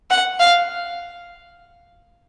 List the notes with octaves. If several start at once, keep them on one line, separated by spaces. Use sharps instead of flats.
F#5
F5